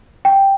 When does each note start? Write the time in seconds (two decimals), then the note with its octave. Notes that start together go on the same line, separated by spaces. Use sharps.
0.25 G5